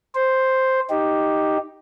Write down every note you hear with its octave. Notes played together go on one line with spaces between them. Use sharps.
C5
D#4 G4